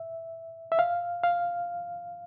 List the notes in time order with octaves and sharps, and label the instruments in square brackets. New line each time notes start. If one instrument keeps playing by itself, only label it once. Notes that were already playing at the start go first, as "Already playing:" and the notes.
Already playing: [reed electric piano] E5
E5
F5
F5